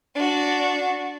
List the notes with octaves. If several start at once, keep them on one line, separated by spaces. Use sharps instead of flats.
D4 F#4